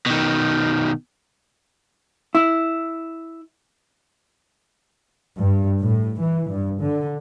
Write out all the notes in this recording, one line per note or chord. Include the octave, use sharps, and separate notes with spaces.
B2 D#3
E4
G2
A2
E3
G2
D3